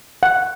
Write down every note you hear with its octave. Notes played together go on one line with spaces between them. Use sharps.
F#5